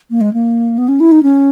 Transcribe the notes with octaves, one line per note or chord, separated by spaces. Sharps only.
A#3
G#3
A#3
B3
C#4
E4
D#4
C#4